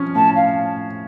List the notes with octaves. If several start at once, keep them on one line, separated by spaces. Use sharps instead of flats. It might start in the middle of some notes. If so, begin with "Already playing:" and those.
Already playing: F3 C#4
A2 A5
F5